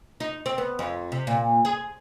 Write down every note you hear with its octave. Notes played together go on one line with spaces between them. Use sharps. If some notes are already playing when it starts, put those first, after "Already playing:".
D#4
C4
B3
F2
C3
A#2
G#4